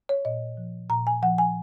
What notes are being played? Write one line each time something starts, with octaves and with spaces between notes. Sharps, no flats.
C#5
A#2 D#5
F3
A#2 A#5
G#5
F3 F#5
G#5